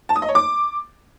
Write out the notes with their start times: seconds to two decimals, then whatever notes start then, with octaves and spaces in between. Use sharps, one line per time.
0.09 A5
0.16 D#6
0.22 D#5
0.29 C#5
0.35 D6